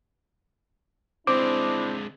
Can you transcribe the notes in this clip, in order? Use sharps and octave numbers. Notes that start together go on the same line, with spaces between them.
D3 G#3 C4 D4 E4 D6